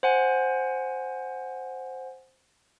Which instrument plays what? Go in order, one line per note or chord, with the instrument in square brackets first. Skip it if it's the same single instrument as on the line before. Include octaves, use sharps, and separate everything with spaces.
[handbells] C5 F#5 G#5